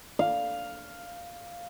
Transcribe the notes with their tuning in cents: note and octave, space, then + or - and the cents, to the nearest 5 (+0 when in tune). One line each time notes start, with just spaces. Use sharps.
F5 +0